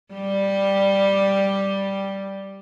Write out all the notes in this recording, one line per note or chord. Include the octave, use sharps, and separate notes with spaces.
G3 G4